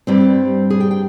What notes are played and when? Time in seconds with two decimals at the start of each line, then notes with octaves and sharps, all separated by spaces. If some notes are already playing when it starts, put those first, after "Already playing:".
0.07 G2 G3 C4
0.70 G#4
0.80 G5
0.91 G5